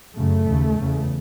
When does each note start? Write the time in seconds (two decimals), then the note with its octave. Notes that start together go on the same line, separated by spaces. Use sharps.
0.15 F#2 C#3 A3
0.46 D#2 C#3
0.78 E2 C#3